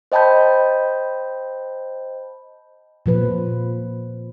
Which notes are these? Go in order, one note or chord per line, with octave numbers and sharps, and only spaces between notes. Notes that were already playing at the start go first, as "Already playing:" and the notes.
C5 D#5 G5 A5 B5 G6
A#2 F3 B4